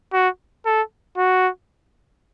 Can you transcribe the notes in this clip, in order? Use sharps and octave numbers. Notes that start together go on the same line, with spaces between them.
F#4
A4
F#4